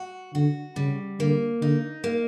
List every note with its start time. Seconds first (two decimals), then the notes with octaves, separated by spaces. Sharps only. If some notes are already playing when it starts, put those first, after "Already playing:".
Already playing: F#4
0.34 D3 F#4
0.76 C#3 G3
1.19 D3 A#3
1.61 D3 D#4
2.04 A#3